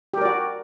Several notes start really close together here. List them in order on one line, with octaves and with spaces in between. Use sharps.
G4 A#4 D5 F#4